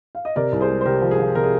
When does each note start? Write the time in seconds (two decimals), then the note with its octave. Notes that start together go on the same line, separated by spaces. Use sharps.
0.15 F5
0.25 D#5
0.36 C3 A#4 D5
0.53 C2
0.60 G#4 C5
0.69 G#3
0.81 C5
0.85 C3 G4 A#4
1.02 F3
1.11 G#4
1.19 F3
1.35 C3 A#4
1.44 G#4